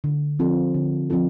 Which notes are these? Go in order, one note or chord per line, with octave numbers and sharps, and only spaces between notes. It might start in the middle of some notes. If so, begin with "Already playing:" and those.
D3
F3 C4 F4 A4
D3
F3 C4 F4 A4